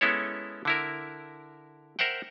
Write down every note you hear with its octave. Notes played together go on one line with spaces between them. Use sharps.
G#3 B3 C#4 E4 A4 C#5
D3 E4 A#4
A#4 C5 E5 F#5 G5